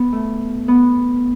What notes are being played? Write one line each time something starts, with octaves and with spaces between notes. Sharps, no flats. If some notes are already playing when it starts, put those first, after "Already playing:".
Already playing: B3
A3
B3